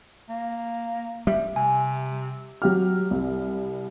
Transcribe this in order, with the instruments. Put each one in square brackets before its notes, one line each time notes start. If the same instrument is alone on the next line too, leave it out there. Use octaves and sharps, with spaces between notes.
[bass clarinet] A#3
[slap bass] G3 [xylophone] E5
[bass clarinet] C3 [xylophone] G#5
[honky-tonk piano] F#3 G4 F6
C2